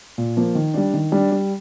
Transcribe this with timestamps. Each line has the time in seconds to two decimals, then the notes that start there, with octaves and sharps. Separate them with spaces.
0.18 A#2
0.37 F3 A#3
0.55 D#3
0.74 G3 D4
0.94 D#3
1.12 G3 D4
1.32 G3